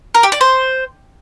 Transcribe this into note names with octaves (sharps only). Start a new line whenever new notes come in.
A#4
G4
D5
C5